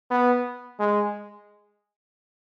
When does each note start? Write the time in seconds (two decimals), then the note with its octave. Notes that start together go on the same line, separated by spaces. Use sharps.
0.11 B3
0.80 G#3